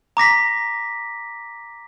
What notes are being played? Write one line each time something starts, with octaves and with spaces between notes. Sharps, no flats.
A#5 D6 A#6 B6